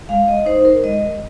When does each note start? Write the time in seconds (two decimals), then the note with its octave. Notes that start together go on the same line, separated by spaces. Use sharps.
0.09 G#3 F5
0.28 D#5
0.46 D#4 C5
0.65 A#4
0.84 G#3 D#5